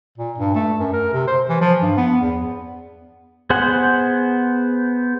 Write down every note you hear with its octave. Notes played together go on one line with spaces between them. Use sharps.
A#2
G2
A3
F#2
A#4
C3
C5
E3
F3
G2
B3
E2
B3 G#4 C5 F#5